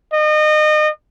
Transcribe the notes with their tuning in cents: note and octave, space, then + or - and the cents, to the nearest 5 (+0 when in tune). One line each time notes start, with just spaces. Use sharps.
D#5 -30